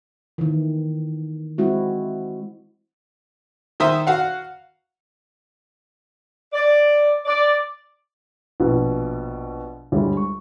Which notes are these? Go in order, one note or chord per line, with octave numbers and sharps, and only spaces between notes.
D#3 E3
G#3 C4 E4 F#4
D#3 C5 E5 D#6
F#4 F5 F#5
D5
D5
A#1 B2
D2 G3 G#3 C#5
C#6